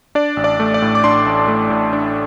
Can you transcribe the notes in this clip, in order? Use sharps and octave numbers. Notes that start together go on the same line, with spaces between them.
D4 D5
A1
D5
A3
D5
A2
D6
D4 C6
A1
A3
A2
D4